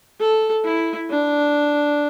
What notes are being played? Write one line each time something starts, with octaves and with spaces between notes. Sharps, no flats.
A4
E4
D4